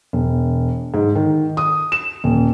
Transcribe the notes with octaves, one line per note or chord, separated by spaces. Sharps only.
E1
G#2
D#3
D#6
E7
D#1